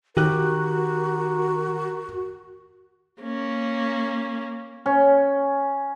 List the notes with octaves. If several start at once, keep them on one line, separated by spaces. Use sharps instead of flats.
D#3 F#4 G4 A#4 F#6
A#3 C#4
C#4